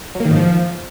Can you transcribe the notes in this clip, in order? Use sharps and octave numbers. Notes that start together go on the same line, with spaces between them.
F#3
A#3
D#3
G#2
F3